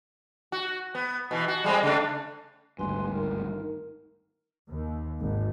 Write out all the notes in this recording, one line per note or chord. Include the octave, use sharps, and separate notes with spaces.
F#4
B3
B2 E3
F#4
G3 G#3 C4
C#3 A3 D4
G#1 D2 G2 B4 G#5 C6
D#4 A#4
D#2
G#1